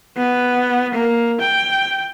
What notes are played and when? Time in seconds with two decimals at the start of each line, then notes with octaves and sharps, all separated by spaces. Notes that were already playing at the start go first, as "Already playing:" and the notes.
0.17 B3
0.94 A#3
1.41 G5